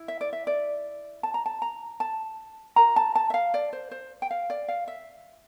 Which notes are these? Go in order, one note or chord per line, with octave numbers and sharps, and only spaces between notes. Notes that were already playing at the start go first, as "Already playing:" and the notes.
Already playing: E4
E5
D5
E5
D5
A5
A#5
A5
A#5
A5
F4 A#4 A#5
A5
A5
E5
F5
D5
C5
C5
G5
F5
D5
F5
E5